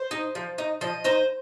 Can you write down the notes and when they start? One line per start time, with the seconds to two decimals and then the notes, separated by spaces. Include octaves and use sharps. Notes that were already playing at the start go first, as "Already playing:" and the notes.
Already playing: C5
0.11 D#4
0.35 F3
0.58 D#4
0.81 F3 D#5
1.04 D#4 C5